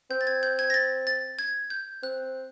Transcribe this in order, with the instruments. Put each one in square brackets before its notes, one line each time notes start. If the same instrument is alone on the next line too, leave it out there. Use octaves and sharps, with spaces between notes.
[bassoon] C4 [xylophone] G6
[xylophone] A6
G#6
G6
G#6
A#6
A6
A6
G#6
G6
[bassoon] C4 [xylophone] F#6